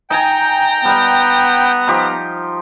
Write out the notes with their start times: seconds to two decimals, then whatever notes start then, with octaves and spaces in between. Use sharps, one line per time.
0.10 D#4 G5 G#5 A#5
0.85 G3 B3 F#5
1.87 F3 D#4 G4